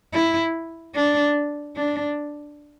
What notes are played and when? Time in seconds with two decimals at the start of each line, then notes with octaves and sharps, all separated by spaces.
0.13 E4
0.96 D4
1.76 D4